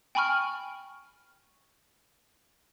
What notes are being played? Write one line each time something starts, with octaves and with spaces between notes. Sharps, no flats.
G5 G#5 B5 C#6 F6